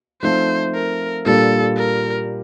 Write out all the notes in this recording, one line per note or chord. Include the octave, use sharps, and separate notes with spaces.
F3 A3 C4 D#4 A4 C5
A#4
A#2 G3 A#3 D4 A4
A#4